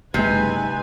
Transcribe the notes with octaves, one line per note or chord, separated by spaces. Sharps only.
F#1 C3 G#3 D#4 B4 G#5